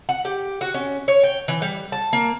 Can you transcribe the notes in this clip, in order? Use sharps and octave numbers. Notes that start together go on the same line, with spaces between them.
F#5
G4
F#4
C#4
C#5
G5
E3
G3
A5
A#3